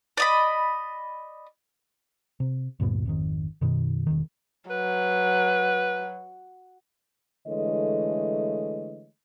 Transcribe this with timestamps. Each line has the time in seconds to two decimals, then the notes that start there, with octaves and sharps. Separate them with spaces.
0.17 D5 D#5 B5
2.40 C3
2.80 D2 G2 A#2 B3
3.06 G#1 F2 D#3
3.61 F#2 B2 D#3
4.07 E1 B1 D#3
4.70 F#3 B4
7.47 D3 E3 G#3 A3 C#5 D#5